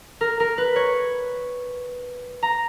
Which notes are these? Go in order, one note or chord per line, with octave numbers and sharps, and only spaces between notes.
A#4
A#4
B4
C#5
A#5